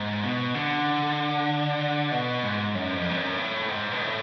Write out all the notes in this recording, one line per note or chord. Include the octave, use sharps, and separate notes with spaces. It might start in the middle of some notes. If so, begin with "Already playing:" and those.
Already playing: G#2
B2
D3
B2
G#2
F#2
F2
G#2
F#2
A2
G#2
B2
A2